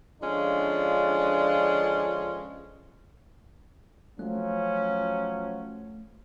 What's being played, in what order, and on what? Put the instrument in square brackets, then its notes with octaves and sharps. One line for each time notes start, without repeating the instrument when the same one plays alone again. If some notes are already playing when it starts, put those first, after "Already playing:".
[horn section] D3 F3 G#3 C#4 D4 F4
[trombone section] F3 F#3 C#4 [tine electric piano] A3